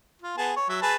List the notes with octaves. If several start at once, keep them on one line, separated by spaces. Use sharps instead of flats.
F4
B3 G#4 A5
C#5
F#3 E5
G#4 B4 A5